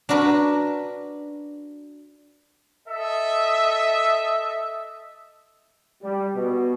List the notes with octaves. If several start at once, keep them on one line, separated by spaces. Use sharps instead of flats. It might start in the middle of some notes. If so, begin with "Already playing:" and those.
D4 F#4 A#4 B4
A4 D#5 E5
G3
B2